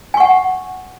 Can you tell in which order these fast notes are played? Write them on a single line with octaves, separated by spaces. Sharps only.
G#5 C#6 F#5